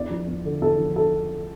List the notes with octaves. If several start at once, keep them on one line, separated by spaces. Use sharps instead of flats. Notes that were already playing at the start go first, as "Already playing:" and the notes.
Already playing: E2 D5
F3
E2
D3
E2 A4
F3
A4